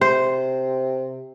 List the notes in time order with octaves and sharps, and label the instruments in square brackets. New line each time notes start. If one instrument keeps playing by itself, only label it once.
[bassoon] C3 [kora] C5